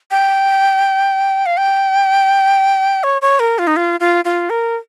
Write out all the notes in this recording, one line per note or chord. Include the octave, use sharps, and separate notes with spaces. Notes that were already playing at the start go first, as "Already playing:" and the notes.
G5
F5
G5
C#5
C#5
A#4
F4
D#4
F4
F4
F4
A#4